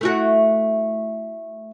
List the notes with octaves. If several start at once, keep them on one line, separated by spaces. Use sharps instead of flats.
A3 E4 F#4